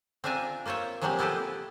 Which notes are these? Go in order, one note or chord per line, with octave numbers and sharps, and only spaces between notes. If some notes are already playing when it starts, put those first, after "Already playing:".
C4 D4 F4 E5 G#5 A#5
A#3 F4 C5 C#5 E5
F3 F#3 G#3 A#3 C4 G4
B3 E4 G4 A4 B4 C5